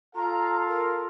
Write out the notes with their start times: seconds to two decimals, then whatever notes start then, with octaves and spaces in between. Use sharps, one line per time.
0.15 F4 A4 F5 A#5
0.68 A#4